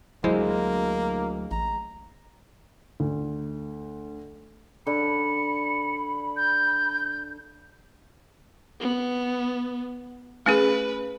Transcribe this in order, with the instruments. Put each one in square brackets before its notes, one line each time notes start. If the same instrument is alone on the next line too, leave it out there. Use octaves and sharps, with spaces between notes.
[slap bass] D2 F#3 [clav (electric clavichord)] G#3 [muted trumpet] A#3 [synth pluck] E4 C5
[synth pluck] A1 [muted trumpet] A#5
[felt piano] D2
[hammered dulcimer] D3 [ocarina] B5 [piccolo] C#7
[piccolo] G6
[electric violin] B3
[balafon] A3 C#4 G#4 [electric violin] B4